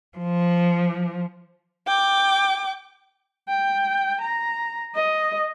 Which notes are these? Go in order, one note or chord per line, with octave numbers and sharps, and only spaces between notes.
F3
G5 D6
G5
A#5
D#5